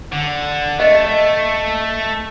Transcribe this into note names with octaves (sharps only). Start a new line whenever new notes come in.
D3
A3 D#5